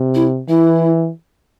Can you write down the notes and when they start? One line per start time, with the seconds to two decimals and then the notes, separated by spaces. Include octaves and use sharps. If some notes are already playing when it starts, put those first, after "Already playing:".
Already playing: C3
0.15 E4
0.49 E3 E4